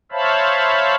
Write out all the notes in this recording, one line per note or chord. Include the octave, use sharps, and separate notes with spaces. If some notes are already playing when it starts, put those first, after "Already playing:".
C5 C#5 E5 F5 A5 B5